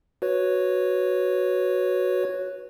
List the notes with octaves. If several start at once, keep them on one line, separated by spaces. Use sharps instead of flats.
F#4 B4 C#5